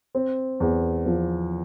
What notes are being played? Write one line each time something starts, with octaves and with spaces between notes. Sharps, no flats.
C4
E2
F3